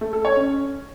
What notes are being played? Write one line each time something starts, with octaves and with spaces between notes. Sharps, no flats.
A3
A4
C#5
C#4